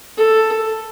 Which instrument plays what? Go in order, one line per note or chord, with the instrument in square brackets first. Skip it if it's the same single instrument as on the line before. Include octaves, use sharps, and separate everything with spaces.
[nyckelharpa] A4